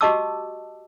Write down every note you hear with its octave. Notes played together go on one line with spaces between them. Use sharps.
F#4 G4 D#5 A5 D6 E6